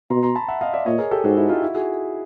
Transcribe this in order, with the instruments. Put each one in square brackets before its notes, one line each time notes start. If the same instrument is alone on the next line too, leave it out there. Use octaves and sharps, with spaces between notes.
[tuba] B2 [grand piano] A#5 C6
[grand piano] A#5 C6
A5 B5
E5 F#5
D#5 F5
D5 E5
[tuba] A#2 [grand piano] C#5 D#5
[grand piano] G#4 A#4
G4 A4
[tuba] G#2 [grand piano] F#4 G#4
[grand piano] E4 F#4
D#4 F4
E4 F#4
F#4 G#4